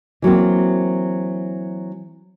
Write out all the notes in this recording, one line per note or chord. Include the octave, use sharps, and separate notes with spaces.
E3 F#3 A#3 C4